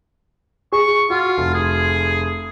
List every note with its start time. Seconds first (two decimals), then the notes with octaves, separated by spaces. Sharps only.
0.72 G#4 C#6
1.10 F4 F#4
1.38 F1
1.54 G#4